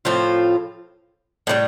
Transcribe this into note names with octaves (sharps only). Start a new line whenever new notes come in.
A2 F3 C4 F4
A2 E3 G3